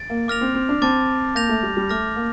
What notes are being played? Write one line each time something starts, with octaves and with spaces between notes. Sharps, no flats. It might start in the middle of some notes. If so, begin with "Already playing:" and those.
Already playing: A6 D7
A#3
A#3 D6 F6 A#6 F7
C4
C4
D4
C4 A5 D6 A6
A#3 G6 A#6 F7
A3
G3
G3
A3 D6 F6 A#6
A#3